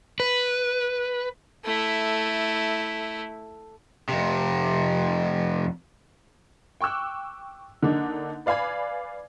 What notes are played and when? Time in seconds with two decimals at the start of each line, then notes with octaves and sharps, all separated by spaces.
0.20 B4
1.65 A3 E4
4.09 F2 C3
6.81 G5 C#6 D6 E6 F#6
7.83 D3 A#3 D4 D#4
8.46 B4 D5 F5 G#5 B5 G#6